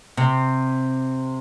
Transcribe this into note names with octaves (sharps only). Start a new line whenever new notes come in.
C3